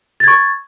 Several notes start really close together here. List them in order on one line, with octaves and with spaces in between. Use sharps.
A6 G#6 C#6